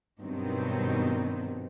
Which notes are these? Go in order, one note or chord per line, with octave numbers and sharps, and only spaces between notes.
G2 B2 D#3 F#3 B3 C4